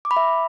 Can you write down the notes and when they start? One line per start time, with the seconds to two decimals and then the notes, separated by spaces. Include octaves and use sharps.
0.05 D6
0.11 B5
0.17 E5